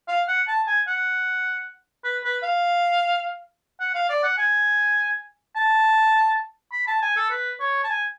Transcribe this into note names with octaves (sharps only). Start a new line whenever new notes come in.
F5
F#5
A5
G#5
F#5
B4
B4
F5
F#5
F5
D5
F#5
G#5
A5
B5
A5
G#5
A4
B4
C#5
A5
G#5